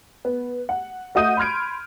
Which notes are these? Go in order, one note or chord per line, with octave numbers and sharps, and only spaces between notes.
B3
F#5
A3 F#4 D#5 D#6 G6 D#7
B5 C6 F6 G#6 D7